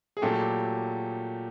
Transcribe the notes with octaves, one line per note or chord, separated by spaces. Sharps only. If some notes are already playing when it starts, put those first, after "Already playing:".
G#4
A#2 F#3 A3 G4 A4